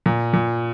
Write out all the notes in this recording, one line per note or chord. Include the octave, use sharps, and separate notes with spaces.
A#2
A#2